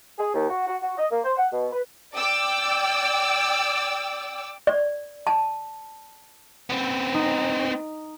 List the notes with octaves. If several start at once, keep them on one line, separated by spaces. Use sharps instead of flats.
G#4
D#2
F#4
F#4
F#4
D#5
A#3
C5
F#5
B2
B4
D5 G5 D6 E6
D5
A5
B3 C4
D#4